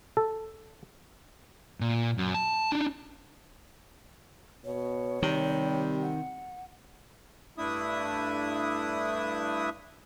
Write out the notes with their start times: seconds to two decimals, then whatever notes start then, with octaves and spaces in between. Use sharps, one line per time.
0.17 A4
1.81 A#2
2.18 F#2
2.34 A5
2.72 D4 D#4
4.64 B2 C#5
5.22 C3 D#3 G3
6.02 F#5
7.58 G2 A3 D4 E4 E5 D#6